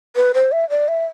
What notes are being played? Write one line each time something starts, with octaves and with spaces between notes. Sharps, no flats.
B4
C5
E5
D5
E5